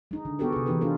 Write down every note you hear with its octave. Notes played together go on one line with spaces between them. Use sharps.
G#3 D#4
D3
B3 F#4 G4 A4 A#4
C3 G#4
E3 B3 C4 D#4 G4 B4
G#3 D4 F4 A4 A#4